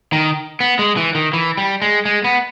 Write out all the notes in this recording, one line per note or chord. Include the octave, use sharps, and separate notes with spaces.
D#3
B3
G#3
E3
D#3
E3
G3
G#3
G#3
B3